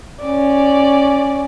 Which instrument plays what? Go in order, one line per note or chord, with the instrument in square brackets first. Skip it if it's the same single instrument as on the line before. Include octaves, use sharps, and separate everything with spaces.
[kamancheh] C#4 D5